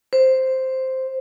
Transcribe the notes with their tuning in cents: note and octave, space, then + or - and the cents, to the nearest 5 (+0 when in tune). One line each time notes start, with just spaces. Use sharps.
C5 +0